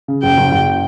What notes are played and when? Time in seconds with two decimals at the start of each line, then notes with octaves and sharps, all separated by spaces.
0.08 C#3
0.23 F#1 G5
0.37 F#1
0.52 F#1